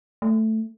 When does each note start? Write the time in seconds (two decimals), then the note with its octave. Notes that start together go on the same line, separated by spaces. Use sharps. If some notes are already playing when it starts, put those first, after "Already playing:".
0.22 A3